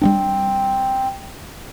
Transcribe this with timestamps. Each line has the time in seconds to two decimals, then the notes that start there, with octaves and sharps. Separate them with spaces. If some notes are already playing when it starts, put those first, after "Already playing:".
0.02 G3 B3 C4 D4